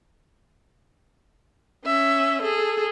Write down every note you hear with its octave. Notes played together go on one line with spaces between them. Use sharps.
C#4 E5
G#4 A4